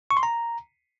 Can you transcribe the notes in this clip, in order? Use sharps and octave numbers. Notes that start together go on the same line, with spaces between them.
C#6
C6
A#5